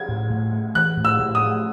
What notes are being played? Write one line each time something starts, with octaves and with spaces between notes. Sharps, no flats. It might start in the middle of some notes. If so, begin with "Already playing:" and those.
Already playing: G#6
A2
A2
A3
E3 F#6
A2
E6
A2
D#6
A3